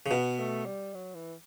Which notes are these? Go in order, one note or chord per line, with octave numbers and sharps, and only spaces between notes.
C#3
B2 B3
A3
G3
F#3
E3